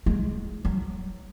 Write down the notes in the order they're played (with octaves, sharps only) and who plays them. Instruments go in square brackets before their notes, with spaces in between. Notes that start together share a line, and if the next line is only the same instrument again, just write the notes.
[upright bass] G#3
F#3